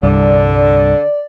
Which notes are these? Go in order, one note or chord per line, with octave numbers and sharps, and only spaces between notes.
C2 G2 D3 D5